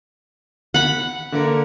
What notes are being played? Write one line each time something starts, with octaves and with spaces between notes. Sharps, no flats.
F#5 B5
D3 A#3 A#4